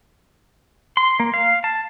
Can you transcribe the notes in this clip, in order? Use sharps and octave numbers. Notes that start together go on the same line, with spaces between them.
C6
A#3
F5
A5